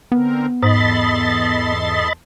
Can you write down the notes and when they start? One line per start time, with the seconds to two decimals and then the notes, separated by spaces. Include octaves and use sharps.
0.12 D3 B3 C4 A#4
0.63 E2 G#2 A4 D#5 B5 C6 A6